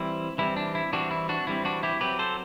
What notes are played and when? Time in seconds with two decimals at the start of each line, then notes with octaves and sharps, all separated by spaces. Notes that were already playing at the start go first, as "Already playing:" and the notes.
Already playing: E3 G3 C4 E4
0.38 E3 G3 C4 E4
0.56 D4
0.75 E4
0.93 E3 G3 C4 D4 F#4
1.11 E4
1.29 D4 F#4
1.47 E3 G3 C4 E4
1.65 D4 F#4
1.83 E4 G4
2.01 F#3 C4 G4 B4
2.19 A4 C5